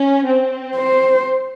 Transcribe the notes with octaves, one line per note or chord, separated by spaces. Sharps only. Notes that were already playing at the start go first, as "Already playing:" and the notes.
Already playing: C#4
C4
C5